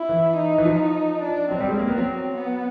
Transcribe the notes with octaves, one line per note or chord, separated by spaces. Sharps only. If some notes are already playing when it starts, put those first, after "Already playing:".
Already playing: E4
E3
D#4
E3
F3
D4
F#3 C4
G3
G#3
A#3
B3
F#3
B3